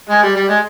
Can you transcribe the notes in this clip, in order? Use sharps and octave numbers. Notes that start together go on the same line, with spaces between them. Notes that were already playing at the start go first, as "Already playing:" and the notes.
G#3
G3
G3
G#3